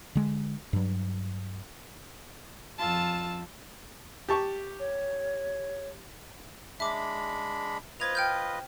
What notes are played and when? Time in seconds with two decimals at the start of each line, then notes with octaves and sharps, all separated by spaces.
0.15 D3 G#3
0.73 G2 F#3
2.80 F2 F4 A5 E6
4.29 G4 A5 C#6
4.80 C#5
6.80 G#3 D4 E5 B5 D6
8.00 F4 B4 C5 D#5 G#6 F7
8.15 G5 F6 G6